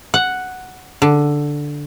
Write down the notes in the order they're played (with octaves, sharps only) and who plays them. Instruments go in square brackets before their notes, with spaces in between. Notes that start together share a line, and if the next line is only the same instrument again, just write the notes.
[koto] F#5
D3